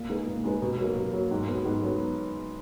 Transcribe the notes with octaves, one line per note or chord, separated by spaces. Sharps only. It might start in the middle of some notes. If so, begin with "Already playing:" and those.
Already playing: A#2
G#3 D#4 G#4 B4
A#2
G#3 D#4 G#4 B4
B2
F#3 A#3
B2
F#3 A#3
G#2
F#3 B3
G#2
F#3 B3